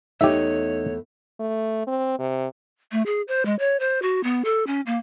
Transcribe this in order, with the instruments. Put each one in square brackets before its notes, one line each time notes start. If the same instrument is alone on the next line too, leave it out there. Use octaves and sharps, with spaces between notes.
[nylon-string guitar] E2 A3 [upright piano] D#4 [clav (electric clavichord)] G4 E5 [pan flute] C#5
[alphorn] A3
C4
C3
[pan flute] A3
G#4
C5
G#3
C#5
C5
F#4
B3
A4
C#4
A#3